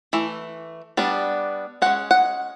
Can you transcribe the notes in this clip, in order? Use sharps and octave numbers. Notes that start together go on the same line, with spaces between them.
E3 A3
G3 B3 D4
G#3 C#4 F#5
F#5